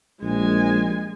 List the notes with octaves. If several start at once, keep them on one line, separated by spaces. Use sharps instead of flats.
A#1 G#3 G#5